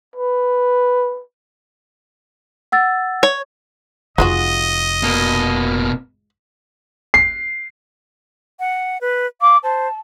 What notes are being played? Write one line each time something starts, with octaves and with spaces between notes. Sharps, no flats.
B4
F#5 E6 A6
C#5
F1 G#3 F4 F#4 D#5
B2 A#3
C7
F#5
B4
F5 D6
C5 A5